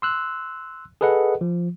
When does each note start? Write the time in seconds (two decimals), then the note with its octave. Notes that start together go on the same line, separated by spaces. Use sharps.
0.02 C6 E6 F#6
1.01 G#4 A4 B4 D#5 F#5
1.41 F3